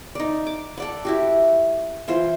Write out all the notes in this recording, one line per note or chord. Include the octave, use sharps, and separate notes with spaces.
D#4 D5
D6
A4 D5 F#5
E4 F#4 G4
E3 F4 C5